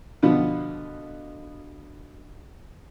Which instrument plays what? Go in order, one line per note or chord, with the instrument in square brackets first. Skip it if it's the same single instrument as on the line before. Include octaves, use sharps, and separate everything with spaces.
[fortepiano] B2 D3 F3 B3